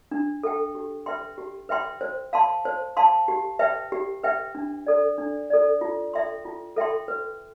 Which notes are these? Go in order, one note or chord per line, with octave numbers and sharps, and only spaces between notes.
D4
A4 E5 G5
G4
B4 E5 G5 C6
G4
B4 E5 G5 C6
C5
F5 A5 C6
C5
F5 A5 C6
G4
B4 E5 G5
G4
B4 E5 G5
D4
A4 D5
D4
A4 D5
F4
A4 E5 G5 C6
F4
A4 E5 G5 C6
B4